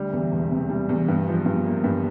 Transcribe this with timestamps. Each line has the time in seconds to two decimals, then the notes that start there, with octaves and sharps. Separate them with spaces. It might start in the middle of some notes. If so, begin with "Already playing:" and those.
Already playing: D2 G3
0.13 E2
0.32 E1
0.51 C3
0.70 G3
0.89 E2
1.08 G2
1.28 F3
1.46 G2
1.65 A#3
1.84 G2